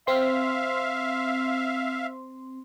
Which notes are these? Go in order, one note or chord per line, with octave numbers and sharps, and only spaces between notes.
C4 E5 F5 C6